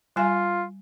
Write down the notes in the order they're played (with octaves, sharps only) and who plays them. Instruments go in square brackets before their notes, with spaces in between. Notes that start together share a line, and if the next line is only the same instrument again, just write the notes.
[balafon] G3 G#5 [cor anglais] F4